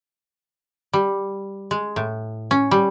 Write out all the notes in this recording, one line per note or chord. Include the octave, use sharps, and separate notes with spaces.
G3
G#3
A2
C#4
G3